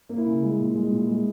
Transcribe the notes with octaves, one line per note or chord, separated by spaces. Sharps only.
A#3
E4
C#3
G#3
A#2
G#3
A#2
G#3